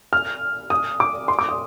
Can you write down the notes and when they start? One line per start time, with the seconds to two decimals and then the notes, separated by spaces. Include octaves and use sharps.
0.13 F6
0.70 D#6
1.00 D6
1.28 C6
1.39 D6
1.49 D#6